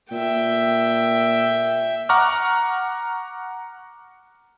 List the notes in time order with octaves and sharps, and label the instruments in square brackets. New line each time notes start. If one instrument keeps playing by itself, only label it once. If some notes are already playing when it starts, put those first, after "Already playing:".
[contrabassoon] A#2 [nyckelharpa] E5 G5
[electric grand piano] F#5 A#5 C#6 D6 F6